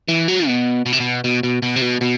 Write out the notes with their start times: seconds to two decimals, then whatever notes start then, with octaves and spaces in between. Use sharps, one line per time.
0.08 E3
0.28 F#3
0.47 B2
0.86 B2
0.92 C3
1.00 B2
1.24 B2
1.43 B2
1.62 B2
1.76 C3
1.82 B2
2.01 B2